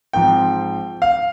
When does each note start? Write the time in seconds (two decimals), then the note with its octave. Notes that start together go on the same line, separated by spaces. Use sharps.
0.13 G#2 F3 C4 G5
1.02 F5